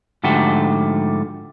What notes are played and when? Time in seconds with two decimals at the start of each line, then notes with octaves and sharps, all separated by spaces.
0.24 G#2 D3 F3 A3 F#4 G4